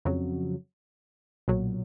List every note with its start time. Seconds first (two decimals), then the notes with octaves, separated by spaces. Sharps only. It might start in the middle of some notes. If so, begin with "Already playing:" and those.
0.05 F2 C#3 F#3
1.48 B1 A#2 F#3